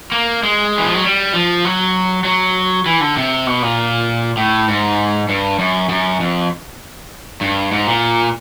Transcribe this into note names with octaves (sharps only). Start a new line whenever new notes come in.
A#3
G#3
E3
F3
F#3
G3
F3
F#3
F#3
E3
D3
C3
B2
A#2
A2
G#2
G2
F#2
F#2
F2
G2
G#2
A#2